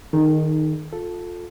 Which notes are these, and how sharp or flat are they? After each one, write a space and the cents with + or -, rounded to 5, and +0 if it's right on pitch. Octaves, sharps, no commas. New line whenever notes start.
D#3 +0 D#4 -15 G#4 +40
F4 +25 A4 +0